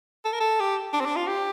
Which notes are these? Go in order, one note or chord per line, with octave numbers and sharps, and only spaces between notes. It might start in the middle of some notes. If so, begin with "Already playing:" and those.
A4
A#4
A4
G4
D4
C4
D4
F4
G4